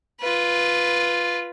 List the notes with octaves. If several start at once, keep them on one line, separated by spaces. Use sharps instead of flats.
F4 B4